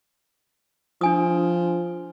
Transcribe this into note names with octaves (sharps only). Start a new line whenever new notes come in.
F3 D4 G#5 D#6